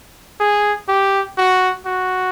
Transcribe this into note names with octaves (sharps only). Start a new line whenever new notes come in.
G#4
G4
F#4
F#4